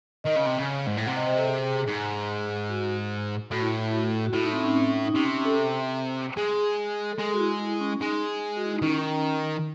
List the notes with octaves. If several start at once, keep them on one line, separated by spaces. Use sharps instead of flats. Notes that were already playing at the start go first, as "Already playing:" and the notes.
D#3 D#5
C#3
C3
C#3
G#2
A2
C3 F#5
D#5
C5
A4
G#4
G#2
F#4
A2 F#4
E4
E4
F#4
F#4
A2 E4
D#4
C4
D#4
C#4
C4
C#4
D#4
C3 C#4
C4
C#4
A4
G#3 G#4
A4
G#3 G#4
F#4
E4
E4
C#4
G#3 D#4
F#4
E4
D#4
D#3 C#4
C#4